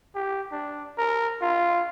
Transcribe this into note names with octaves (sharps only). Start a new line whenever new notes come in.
G4
D4
A#4
F4